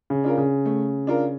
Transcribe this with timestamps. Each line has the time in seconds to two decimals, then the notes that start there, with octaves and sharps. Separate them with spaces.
0.10 C#3
0.24 D4 F4 A#4
0.38 C#3
0.65 A3
1.07 D4 F4 A#4